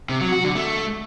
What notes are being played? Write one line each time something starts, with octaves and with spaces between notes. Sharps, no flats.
C3
F#3
F#4
D3
A3